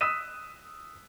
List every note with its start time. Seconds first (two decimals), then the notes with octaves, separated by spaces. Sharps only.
0.01 D#6 E6 F#6 B6 D#7 E7